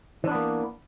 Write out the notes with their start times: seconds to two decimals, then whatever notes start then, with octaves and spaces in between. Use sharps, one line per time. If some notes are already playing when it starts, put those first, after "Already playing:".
0.24 E3
0.28 D4
0.31 B3
0.35 A#3